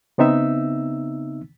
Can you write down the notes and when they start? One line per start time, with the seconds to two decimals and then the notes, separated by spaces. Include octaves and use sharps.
0.18 C#3 B3 C4 D#4 E5 E6